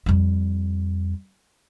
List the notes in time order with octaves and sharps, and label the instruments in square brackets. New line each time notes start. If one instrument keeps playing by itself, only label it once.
[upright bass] F2 G3